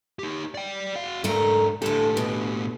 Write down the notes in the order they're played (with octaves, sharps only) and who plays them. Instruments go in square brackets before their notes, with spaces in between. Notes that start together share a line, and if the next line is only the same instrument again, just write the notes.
[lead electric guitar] D#4 G4
D5 G5
F#4 F5
[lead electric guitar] G#2 D4 [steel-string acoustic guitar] A3 A#4
[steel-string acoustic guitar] D2 A4 [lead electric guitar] A2 G4
[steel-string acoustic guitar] B2